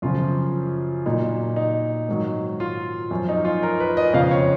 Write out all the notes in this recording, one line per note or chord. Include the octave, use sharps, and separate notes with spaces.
F#2 C#3 F3 F4
A#2 F#3 D#4
D#4
G#2 D#3 F#3
F4
F#2 F3
D#4
F4
A#4
B4
D#5
F2 C#3 F3 F5
C#5